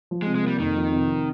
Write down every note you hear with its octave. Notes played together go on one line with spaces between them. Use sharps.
F3
G#3
C3
G#3
G3 A#3
F2 D#3
F3
C3
D#4